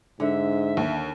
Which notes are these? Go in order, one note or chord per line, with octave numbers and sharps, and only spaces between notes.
G#2 D3 E5
D#2